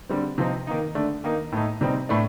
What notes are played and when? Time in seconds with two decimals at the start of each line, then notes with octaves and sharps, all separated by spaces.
0.09 D3 G3 C4
0.38 C3 F3 C4 D#4
0.67 D#3 A#3 D#4
0.95 D3 A3 D4
1.24 D#3 A#3 D#4
1.52 A2 A3 D#4
1.81 C3 G3 C4 D#4
2.09 A2 A3 D4